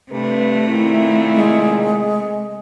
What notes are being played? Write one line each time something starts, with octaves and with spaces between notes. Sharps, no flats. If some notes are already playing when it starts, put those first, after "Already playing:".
G2 C3 A3 B4
A#2 D#3 E4
G#3